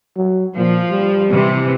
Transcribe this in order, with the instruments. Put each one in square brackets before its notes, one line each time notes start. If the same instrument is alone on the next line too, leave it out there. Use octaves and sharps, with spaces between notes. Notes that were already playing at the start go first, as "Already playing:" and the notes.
[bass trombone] F#3
[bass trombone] A#2 [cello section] F3
[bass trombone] G3
[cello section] C3 E3